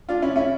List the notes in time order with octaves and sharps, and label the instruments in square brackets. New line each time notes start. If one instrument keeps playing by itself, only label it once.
[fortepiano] D4 F4
C#4 E4
C#4 E4